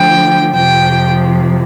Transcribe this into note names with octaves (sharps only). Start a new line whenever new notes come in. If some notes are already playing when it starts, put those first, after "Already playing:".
Already playing: D3 F3 A3 G5
F2 C3 F3 G5